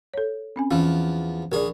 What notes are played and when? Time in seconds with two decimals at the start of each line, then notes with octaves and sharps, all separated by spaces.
0.14 A4 C#5
0.56 C4 C#4 G#5
0.71 E2 E3 F3 C#4 F5
1.52 A#1 G#4 A#4 D5